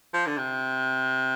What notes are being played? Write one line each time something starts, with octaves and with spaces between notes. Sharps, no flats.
F3
D3
C3